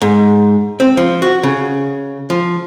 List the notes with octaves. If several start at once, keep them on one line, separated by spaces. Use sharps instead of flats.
G#2
C4
F3
F#4
C#3
F3